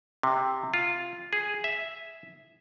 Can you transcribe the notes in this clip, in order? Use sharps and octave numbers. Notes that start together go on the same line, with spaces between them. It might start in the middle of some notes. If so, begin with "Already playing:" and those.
C3
F4
G#4
E5